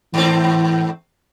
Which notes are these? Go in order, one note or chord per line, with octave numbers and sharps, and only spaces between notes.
G#2 E3 A3 C4